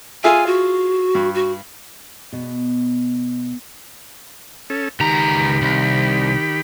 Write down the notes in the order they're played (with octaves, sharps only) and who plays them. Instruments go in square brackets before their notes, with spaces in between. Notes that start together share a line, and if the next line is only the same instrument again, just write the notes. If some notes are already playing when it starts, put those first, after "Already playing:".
[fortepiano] F4 G#4 E5 [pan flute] G#5
[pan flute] F#4
[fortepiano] G2
[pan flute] F#4
[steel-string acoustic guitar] B2
[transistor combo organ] C#4 A4
[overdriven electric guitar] C#2 A#5 [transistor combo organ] D#3 G4 B5
[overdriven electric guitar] C2